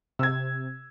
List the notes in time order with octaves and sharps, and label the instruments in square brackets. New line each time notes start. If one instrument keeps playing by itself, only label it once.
[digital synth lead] C3 [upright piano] E6 G#6